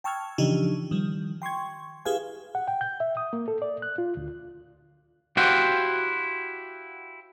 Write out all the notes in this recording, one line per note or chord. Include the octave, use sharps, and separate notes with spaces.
G5 A5 C#6 E6 F6 G#6
C#3 E3 F3 D4 D#4 G4
D#3 F3 G3
G5 C6 C#6 G#6
E4 G4 G#4 B4 F5 G#5
F#5
G5
G6
E5
D#6
A#3
A4
D5
F#6
F4
D2
E4 F#4 G4 C5 F5 F#5